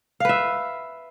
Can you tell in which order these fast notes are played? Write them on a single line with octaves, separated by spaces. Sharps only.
F5 B4 E5